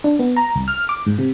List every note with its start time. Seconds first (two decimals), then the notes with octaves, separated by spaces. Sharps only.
0.04 D4
0.19 B3
0.37 A#5
0.55 C2
0.68 F6
0.89 D6
1.06 G#2
1.18 C3